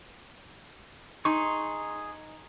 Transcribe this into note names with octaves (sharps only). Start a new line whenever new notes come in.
D#4 G#4 C6 C#6